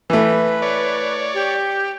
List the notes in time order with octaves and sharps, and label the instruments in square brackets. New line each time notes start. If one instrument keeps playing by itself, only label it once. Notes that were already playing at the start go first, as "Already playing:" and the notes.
[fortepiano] E3 A3 [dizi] B4
[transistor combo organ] C#5 D5
[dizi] G4